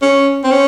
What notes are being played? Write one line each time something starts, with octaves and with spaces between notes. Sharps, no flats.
C#4
C4
C#4